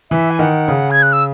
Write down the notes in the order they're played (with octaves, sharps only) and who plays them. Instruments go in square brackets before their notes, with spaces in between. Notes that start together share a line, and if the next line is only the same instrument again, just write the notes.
[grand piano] E3 [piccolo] E5
[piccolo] G#5
[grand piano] D#3 [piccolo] F#5
[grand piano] C#3
[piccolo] G#6
F#6
E6